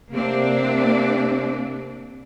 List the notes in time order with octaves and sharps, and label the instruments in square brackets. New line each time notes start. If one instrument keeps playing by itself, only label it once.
[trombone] C3 [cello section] A#3 C4 D4